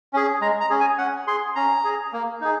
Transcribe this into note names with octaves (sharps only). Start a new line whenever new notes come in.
C#4 G#4
G#3 A#5
A#5
C#4 G#4
G#5
C#4 F#5
G#4 C6
C#4 A#5
G#4
A#3
D#4 G#4